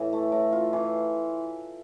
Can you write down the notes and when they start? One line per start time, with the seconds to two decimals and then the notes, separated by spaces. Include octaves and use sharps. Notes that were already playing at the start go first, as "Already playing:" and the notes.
Already playing: A2 E3
0.13 A3
0.32 A2
0.53 F4
0.73 E3